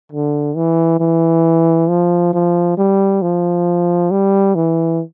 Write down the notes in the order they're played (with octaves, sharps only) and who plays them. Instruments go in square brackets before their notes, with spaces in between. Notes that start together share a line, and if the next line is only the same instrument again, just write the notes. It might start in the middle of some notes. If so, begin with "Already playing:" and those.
[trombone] D3
E3
E3
F3
F3
G3
F3
G3
E3